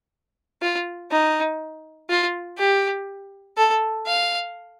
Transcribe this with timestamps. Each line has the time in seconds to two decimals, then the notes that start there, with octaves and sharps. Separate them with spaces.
0.62 F4
1.11 D#4
2.10 F4
2.58 G4
3.57 A4
4.07 F5